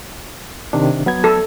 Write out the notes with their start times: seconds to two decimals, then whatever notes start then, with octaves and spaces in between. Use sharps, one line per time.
0.73 C3 D#3 D4
1.06 F#3 B3 G#6
1.24 A4